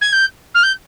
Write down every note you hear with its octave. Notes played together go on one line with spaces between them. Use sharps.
G#6
G6
F6
G6